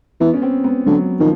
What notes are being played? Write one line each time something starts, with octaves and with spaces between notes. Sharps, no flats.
E3 B3
C#4
C4
B3
D3 F#3
D#3 F3